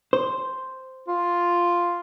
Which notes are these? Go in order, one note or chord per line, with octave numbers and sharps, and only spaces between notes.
C5
F4